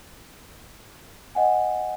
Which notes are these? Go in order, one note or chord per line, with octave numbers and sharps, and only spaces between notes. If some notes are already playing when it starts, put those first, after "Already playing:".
D#5 F#5 G#5